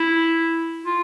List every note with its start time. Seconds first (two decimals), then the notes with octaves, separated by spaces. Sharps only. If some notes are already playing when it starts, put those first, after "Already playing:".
Already playing: E4
0.86 F4